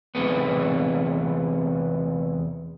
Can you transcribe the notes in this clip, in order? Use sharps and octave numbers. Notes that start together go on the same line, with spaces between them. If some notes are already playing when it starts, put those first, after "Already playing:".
E2 C3 A3 B3